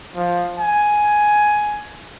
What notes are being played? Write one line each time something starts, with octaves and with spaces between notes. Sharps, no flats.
F3
G#5